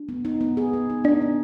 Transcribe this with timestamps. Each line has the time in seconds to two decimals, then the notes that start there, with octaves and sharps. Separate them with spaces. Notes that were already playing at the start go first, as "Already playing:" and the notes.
Already playing: D4
0.09 B3
0.25 D#4
0.41 B3
0.57 G#4
0.73 B3
0.90 D#4
1.04 D4 D#4
1.22 B3